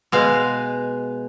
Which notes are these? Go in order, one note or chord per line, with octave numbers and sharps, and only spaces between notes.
B2 G#3 F5